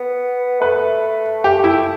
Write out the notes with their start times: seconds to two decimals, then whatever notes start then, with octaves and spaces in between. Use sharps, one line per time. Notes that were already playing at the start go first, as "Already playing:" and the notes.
Already playing: B3
0.60 A3 B4
1.44 G4
1.64 E4